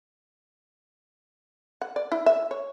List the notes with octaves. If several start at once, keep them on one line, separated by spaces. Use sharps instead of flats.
F#5
D5
E4
E5
C#5